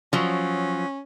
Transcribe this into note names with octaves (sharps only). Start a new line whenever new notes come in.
F3 F#3 C#4